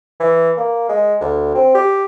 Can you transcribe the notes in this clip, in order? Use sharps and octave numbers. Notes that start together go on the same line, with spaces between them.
E3
A#3
G#3
D2
C4
G4